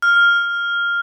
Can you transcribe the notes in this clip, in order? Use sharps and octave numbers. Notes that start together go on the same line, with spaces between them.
F6